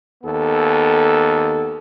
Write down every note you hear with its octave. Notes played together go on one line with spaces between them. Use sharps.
D#2 B3 A4